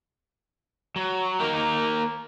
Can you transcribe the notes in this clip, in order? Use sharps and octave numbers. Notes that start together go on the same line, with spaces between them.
F#3
A#3 D#4 A#4